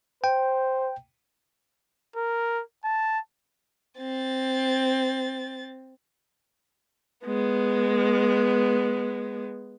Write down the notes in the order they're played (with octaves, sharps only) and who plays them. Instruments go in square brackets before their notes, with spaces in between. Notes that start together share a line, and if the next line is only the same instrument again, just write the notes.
[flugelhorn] C5 [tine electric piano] G5
[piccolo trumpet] A#4
A5
[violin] C4 A6
[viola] G#3 B3